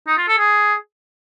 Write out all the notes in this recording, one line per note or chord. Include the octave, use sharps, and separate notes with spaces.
D#4
F4
A4
G#4